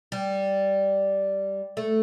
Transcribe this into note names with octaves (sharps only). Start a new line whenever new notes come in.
G3
A3